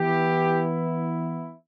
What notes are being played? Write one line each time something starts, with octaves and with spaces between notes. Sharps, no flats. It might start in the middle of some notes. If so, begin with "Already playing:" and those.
Already playing: E3 B3 E4 G4